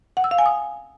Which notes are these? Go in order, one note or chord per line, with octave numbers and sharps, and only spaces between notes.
F#5
E6
F5
G#5
D#6